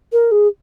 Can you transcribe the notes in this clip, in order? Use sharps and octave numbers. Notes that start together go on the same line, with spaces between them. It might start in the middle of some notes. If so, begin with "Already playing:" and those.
A#4
G#4